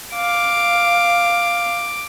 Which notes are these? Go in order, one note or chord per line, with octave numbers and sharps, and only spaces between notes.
F5 D6